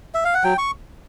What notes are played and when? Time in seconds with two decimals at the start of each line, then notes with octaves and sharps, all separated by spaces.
0.14 E5
0.25 F5
0.34 F#5
0.44 F#3 G5
0.58 C#6